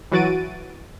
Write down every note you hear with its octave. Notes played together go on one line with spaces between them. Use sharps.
E3 F#3 F#4 A6 D7 D#7